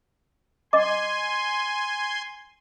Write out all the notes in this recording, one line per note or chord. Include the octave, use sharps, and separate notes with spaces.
D#5 G#5 C6 D6